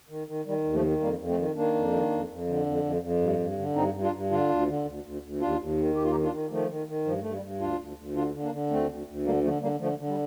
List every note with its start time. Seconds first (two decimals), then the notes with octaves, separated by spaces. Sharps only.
0.09 D#3
0.27 D#3
0.45 D#3 G3
0.64 D#2
0.73 F3 A3
0.82 D#3
1.00 F2 G3 A#3
1.19 F2
1.28 A3 C4
1.37 D#3
1.55 D#3 A#3 D4
1.74 F2
1.92 D#3
2.11 F2
2.29 F2
2.47 D3
2.66 F2
2.83 F2
3.02 F2
3.21 G2
3.39 G2
3.57 D3
3.75 G2 C4 D#4
3.94 G2
4.02 D4 F4
4.12 G2
4.30 D3 D4 F4
4.49 D2
4.66 D3
4.85 D2
5.04 D2
5.22 D2
5.40 D#2 D4 F4
5.59 D#2
5.77 D#3
5.95 D#2 G4
6.03 F4
6.11 D#3 D#4 G4
6.23 D4 F4
6.32 D#3
6.50 D#3 F3 A3
6.69 D#3
6.87 D#3
7.05 G2 F3
7.22 G2 A3
7.33 G3
7.42 G2
7.60 D2 D4 F4
7.79 D2
7.97 D2
8.15 D3 D4 F4
8.34 D3
8.42 A#3 D4
8.52 D3
8.70 D2 A3 C4
8.89 D2
9.07 D2
9.25 D3 G3 A#3
9.43 D3 F3 A3
9.62 D3 G3 A#3
9.80 D3 F3 A3
9.98 D3
10.07 G3